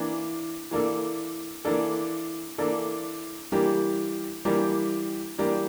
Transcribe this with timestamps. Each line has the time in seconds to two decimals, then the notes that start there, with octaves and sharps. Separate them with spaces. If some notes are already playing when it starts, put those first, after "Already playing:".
Already playing: E3 A#3 D4
0.71 E3 A#3 D4 A4
1.65 E3 A#3 D4 A4
2.58 E3 A#3 D4 A4
3.52 E3 G3 A#3 D4 G4
4.45 E3 G3 A#3 D4 G4
5.38 E3 G3 A#3 D4 G4